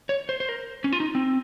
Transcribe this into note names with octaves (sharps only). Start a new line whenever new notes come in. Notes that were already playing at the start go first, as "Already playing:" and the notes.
C#5
C5
C5
A#4
C#4
F4
D#4
C4